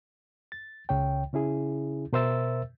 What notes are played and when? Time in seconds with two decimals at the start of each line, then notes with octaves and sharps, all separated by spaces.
0.52 A6
0.89 C#2 C#3 C#5 G5
1.33 C#3 C#4 E4 G#4
2.13 B2 A#4 C5 E5 E6 A6